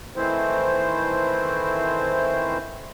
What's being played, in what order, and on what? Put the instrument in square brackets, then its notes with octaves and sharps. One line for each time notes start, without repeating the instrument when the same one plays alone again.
[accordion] D#3 E3 A3 C4 E4 C5